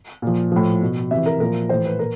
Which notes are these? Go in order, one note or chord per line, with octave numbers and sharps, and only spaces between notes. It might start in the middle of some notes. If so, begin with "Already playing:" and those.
A#2 F3
A2 F3
B2
C3 E3 E5
A#4
A#2 F3 A#4
A2 E3 C5
B4
A#2 A#4